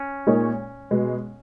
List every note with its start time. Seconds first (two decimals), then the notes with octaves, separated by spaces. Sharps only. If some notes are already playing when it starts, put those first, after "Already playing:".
Already playing: C#4
0.27 A#2 G#3 D#4 A#4 C#5
0.91 B2 G#3 B3